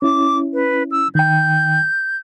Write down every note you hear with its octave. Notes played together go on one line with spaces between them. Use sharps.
C#4 E4 D6
B4
E6
D#3 G5 G6